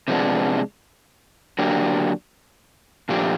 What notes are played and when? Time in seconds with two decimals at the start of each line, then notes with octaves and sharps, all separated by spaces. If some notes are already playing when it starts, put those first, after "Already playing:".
0.08 C3 F3 G#3 B3 D4
1.59 D3 F#3 A#3 D4 G4
3.09 A#2 F3 A3 D4 G4